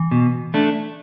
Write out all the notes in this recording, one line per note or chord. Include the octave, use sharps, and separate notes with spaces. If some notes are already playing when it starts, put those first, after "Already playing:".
Already playing: E3
B2
A3 D4